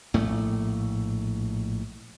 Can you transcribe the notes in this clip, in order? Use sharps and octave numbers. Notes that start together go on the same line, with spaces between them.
A#1 A2 A3